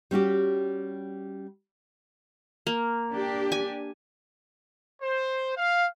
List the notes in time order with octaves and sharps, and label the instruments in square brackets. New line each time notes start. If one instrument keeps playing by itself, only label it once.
[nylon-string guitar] G3 C#4 F#4 G4
[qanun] A#3
[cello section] D4 G4
[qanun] G#5
[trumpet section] C5
F5